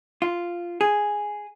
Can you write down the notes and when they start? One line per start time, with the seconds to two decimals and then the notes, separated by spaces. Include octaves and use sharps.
0.22 F4
0.81 G#4